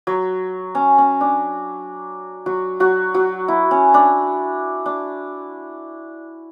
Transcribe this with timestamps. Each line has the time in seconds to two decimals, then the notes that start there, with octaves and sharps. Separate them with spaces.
0.07 F#3
0.75 C#4
0.98 C#4
1.21 D4
2.46 F#3 F#4
2.80 F#3 F#4
3.14 F#3 F#4
3.48 E4
3.71 C#4
3.94 D4
4.86 D4